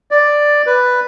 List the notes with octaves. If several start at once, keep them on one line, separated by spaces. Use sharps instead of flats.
D5
B4